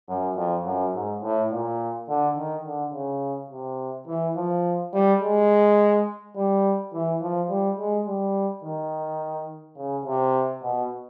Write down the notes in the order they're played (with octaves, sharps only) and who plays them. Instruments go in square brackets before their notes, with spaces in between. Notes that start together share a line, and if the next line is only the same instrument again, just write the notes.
[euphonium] F#2
F2
F#2
G#2
A2
A#2
D3
D#3
D3
C#3
C3
E3
F3
G3
G#3
G3
E3
F3
G3
G#3
G3
D#3
C#3
C3
B2